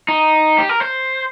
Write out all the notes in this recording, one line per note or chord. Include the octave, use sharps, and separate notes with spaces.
D#4
G4
A#4
C5